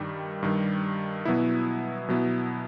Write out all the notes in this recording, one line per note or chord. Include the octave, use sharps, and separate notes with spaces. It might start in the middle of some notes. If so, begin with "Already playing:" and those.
Already playing: G2 D#3 G3
G2 D#3 G3
B2 F#3 B3 E4
B2 F#3 B3 E4